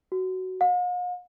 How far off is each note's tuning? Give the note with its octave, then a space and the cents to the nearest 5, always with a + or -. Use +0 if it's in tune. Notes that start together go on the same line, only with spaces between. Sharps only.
F#4 +10
F5 +45